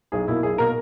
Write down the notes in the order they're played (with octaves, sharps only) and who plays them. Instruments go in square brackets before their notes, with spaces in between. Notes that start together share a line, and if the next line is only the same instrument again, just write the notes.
[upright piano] B1 [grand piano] G#4
[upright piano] B2 A#3 [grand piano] E4
[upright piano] B1 [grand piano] G#4
[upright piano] B2 A#3 [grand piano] A#4